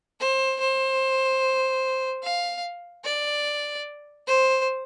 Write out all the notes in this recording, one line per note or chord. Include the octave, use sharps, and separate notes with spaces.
C5
C5
F5
D5
C5